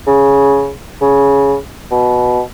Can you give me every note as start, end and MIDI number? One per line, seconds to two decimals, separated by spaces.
0.07 0.71 49
1.01 1.55 49
1.91 2.41 47